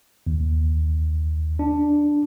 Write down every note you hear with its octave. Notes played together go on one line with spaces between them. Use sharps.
D#2
D4